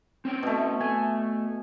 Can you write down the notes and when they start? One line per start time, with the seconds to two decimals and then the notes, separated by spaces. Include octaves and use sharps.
0.25 C4 C#4 G5
0.43 B2 A3
0.81 A3 G#5